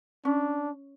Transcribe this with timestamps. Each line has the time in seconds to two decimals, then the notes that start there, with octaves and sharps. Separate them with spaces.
0.25 C#4 D4